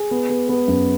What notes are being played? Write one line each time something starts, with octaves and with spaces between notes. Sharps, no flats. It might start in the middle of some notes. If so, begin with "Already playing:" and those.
Already playing: G#4
B3
B3
B3
F#2